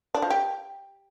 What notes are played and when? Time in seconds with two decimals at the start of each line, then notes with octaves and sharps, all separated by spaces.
0.14 D4
0.22 F3
0.30 G4